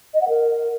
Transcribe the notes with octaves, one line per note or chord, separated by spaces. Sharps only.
D#5
F#5
A#4